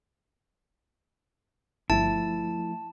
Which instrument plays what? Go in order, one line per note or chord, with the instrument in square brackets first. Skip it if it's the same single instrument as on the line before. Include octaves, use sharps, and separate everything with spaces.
[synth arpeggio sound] G1 [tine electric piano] F3 A3 [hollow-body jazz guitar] E4 [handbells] A5